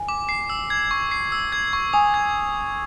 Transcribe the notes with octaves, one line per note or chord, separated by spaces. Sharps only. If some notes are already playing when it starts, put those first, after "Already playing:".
Already playing: G#5
D6
C7
E6
G#6
C#6
C7
E6
G#6
C#6
G#5 D#6
G#6